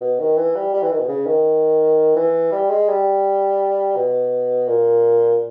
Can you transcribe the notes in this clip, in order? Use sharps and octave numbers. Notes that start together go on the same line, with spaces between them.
B2
D#3
E3
G3
G3
E3
D#3
B2
C#3
D#3
E3
G3
G#3
G3
B2
A#2